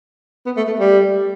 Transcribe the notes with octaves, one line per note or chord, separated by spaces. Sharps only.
B3
A3
A3
G3